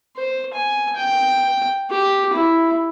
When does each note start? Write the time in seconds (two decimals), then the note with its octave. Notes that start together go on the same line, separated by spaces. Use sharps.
0.17 C5
0.54 G#5
0.96 G5
1.91 G4
2.34 E4